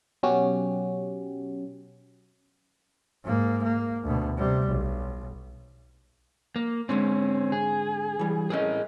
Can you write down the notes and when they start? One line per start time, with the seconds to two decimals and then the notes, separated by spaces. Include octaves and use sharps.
0.23 B2 F#3 C#4 F#4 G4
3.24 G#2 A#3
3.63 A#3
4.04 D2 B2
4.38 C3 G3
4.68 B1
6.56 A#3
6.89 G#2 D3 G#3 C4 C#4
7.52 G#4
8.19 E3 G3
8.50 A2 A3 C#4 G#4 A#4 D#5